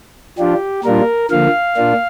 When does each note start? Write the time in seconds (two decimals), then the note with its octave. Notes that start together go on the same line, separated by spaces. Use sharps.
0.39 F3 D4 F4 G4
0.84 A#2 G3 D4 F4 A#4
1.31 D3 F3 A#3 F5
1.77 A#2 A#3 D4 F4